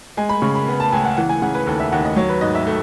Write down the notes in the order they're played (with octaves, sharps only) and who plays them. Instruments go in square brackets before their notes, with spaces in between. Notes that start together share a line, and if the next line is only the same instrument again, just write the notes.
[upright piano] G#3 G#5
B5
C#3 C#6
B5
B3
A5
C#2 G#5
F#5
E3 F#5
G#5
C#3 F#5
B4
D#2 A4
E5
D#2 F#5
D#5
F#3 C#5
B4
G#2 D#5
E5
A3